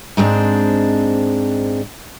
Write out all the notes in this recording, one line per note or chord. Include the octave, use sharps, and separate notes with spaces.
G#2 G#3 C4 D4